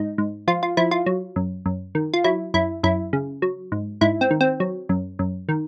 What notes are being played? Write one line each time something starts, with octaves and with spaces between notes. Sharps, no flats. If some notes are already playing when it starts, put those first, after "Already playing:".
Already playing: G#2 D#4
G#2
F3 F4
F4
F3 E4
F4
F#3
F#2
F#2
D#3
F4
F#3 E4
F#2 E4
F#2 E4
C#3
F#3
G#2
G#2 E4
C4
D#3
C4
F#3
F#2
F#2
D#3